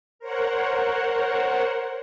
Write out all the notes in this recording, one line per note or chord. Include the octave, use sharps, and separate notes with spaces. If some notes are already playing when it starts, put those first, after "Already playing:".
A#4 C5 C#5 F#5